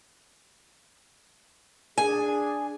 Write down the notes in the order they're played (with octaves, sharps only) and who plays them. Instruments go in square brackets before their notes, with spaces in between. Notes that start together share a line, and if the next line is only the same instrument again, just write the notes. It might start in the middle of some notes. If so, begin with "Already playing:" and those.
[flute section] D4 G#4 [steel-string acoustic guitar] G#5